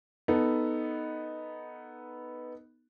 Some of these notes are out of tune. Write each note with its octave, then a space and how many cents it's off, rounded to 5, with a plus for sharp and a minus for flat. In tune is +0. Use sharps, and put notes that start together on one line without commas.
B3 +0 D#4 +0 A4 +0